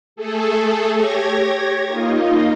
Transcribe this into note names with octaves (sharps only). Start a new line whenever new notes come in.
A3 G#4 A4
G4 C#5 G#6 A#6
A#3 D#4 F4 D#5